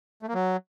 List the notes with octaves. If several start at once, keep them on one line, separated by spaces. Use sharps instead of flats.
A3
A#3
F#3